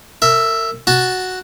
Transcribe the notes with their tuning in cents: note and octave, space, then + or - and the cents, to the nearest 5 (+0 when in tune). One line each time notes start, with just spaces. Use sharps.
A#4 -40 E5 +0
F#4 +0 A5 +0